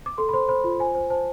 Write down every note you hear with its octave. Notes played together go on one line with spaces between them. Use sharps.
D6
A4 C6
B5
C5 C6
C5 B5
F4 B5
C5 G#5
C5
C5 A5